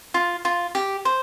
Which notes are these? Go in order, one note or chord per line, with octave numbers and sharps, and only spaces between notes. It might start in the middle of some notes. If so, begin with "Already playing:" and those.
F4
F4
G4
C5